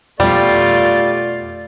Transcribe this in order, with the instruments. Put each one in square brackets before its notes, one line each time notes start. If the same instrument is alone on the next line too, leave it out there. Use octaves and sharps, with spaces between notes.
[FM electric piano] F2 B2 [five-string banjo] G3 [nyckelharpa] A3 F4 [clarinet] D5